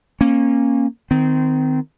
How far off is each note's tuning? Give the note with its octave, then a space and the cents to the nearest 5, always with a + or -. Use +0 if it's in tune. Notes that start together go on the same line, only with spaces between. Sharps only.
A#3 +0 C#4 -25
D#3 +0 C4 -25